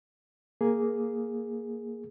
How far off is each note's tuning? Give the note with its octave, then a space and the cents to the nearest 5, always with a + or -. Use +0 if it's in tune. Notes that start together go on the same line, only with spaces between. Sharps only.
A#3 +0 G#4 +0